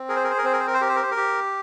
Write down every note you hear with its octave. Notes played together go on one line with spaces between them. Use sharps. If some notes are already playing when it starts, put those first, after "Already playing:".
Already playing: C4
G#4 A#4
C5
A#4
C5
A#4
C4 C5
A#4
C5
A#4
C5
G4 A#4
C5
A#4
C5
A#4
G4